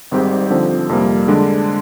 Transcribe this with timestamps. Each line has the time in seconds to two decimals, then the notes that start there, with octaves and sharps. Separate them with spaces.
0.11 G#1 G#2 G3 C4 G4
0.50 D3 F3 C4 D#4
0.89 F2 C3 G3 A#3
1.28 D3 G#3 D4